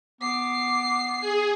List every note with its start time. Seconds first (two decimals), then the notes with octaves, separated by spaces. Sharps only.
0.21 B3 D6 C7
1.21 G#4